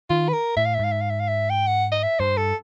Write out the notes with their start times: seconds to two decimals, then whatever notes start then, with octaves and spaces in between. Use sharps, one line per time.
0.09 D#3 F4
0.29 B4
0.33 A#4
0.56 A2 E5
0.66 F5
0.74 E5
0.79 G#2 F5
0.92 E5
1.01 F5
1.10 E5
1.20 F5
1.28 E5
1.50 G5
1.67 F#5
1.92 D#5
2.03 E5
2.19 G2 C5
2.37 A4